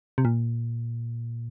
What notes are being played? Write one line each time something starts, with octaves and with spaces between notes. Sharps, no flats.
C3
A#2